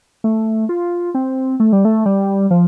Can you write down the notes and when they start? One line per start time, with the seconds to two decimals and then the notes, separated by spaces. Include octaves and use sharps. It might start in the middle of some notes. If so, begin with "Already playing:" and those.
0.24 A3
0.69 F4
1.15 C4
1.60 A3
1.73 G3
1.85 A3
2.06 G3
2.51 F3